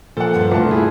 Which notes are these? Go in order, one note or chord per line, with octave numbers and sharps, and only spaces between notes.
A#2 F3 A4 F#5
D2 G2 D3
C2 A3 F4 A5
E4 G#4